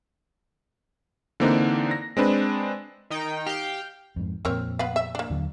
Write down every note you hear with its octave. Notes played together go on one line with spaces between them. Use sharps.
D3 E3 A#3 C4 D4 D#4
A#6
G#3 C4 D4 B4
D#3 D#4 G5
G4 F5 G5
F2 G#2
F2 A#2 C4 A#4 C#5
B3 B4 F5
E5
A#3 D4
D#2 D3 F#3